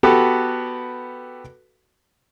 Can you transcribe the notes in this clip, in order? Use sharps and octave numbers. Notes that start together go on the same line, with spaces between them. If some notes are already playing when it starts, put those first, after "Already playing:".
B3 F#4 G4 A4 B4